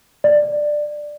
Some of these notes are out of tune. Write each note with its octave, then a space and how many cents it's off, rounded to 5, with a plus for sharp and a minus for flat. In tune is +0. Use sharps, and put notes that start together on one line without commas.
D5 +10